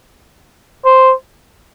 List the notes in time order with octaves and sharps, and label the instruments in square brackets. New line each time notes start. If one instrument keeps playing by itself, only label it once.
[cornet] C5